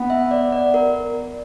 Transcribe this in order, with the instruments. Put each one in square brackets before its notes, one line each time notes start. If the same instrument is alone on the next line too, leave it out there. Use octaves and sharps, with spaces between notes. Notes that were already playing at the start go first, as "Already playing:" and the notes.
Already playing: [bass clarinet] B3
[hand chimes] E5
D5
D5
A#4